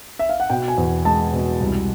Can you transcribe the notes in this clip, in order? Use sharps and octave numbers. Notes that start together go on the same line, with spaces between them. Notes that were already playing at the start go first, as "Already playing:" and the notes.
E5
F5
F#5
B2 G5
G#5
E2
G#3 A5
B2
C2